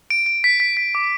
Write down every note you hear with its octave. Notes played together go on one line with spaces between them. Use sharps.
D7
D7
B6
B6
B6
D6